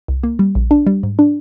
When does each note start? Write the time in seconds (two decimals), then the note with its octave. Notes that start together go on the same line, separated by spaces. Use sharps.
0.08 C2
0.23 A#3
0.39 G3
0.55 A#1
0.71 D4
0.87 G3
1.03 G#2
1.19 D4